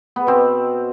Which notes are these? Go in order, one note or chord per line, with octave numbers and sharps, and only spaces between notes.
B3
B2 C4